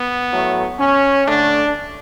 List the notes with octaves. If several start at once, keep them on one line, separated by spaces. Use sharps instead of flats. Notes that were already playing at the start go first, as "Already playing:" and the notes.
Already playing: B3
A2 F#3 A3
C#4
D3 A3 D4